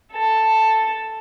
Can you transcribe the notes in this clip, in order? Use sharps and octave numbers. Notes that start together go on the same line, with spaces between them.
A4 A5